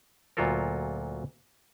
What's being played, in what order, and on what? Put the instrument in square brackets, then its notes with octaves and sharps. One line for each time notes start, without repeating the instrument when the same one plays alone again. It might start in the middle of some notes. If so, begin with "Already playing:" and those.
[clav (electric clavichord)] D2 A#2 F#3 F4 A4 A#4